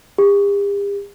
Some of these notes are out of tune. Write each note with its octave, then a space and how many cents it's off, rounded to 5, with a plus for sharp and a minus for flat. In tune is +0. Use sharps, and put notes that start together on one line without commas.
G4 +45